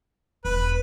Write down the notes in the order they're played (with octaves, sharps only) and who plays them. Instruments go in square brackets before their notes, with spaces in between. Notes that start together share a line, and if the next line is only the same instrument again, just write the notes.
[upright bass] E1 [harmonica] B4